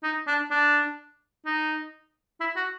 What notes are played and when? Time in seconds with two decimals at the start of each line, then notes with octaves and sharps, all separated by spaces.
0.03 D#4
0.27 D4
0.51 D4
1.46 D#4
2.40 E4
2.56 F#4